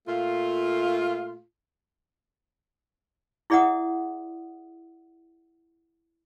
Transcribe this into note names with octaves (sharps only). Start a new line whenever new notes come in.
A#2 A3 F4
E4 G#4 D5 E5 F#5 D#6